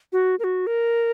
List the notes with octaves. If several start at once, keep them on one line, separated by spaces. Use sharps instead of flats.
F#4
A#4
F#4
A#4